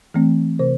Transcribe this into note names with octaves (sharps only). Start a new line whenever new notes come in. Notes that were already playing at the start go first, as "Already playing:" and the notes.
E3 A3 C4
C3 C5